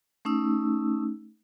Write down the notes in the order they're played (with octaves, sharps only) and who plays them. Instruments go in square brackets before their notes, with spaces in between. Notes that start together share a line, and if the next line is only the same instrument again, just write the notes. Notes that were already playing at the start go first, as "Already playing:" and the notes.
[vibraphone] A3 C#4 D#4 E6